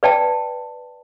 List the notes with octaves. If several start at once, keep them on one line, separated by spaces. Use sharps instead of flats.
B4 D5 G5 A5